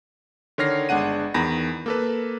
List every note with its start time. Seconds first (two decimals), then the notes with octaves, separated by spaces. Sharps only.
0.58 D3 D#3 C#5 F6 A#6 C7
0.89 G1 G#3 D4 F#5 D#7
1.34 E2 D#3 B5 A#6
1.86 A#3 A4 B4